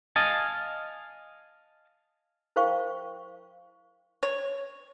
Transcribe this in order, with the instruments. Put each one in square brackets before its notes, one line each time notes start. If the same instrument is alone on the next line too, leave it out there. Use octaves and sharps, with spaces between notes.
[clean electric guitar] D#5 F5 G#5 A5
[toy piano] E4 A#4 C5 F5 G5 C#6
[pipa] C#5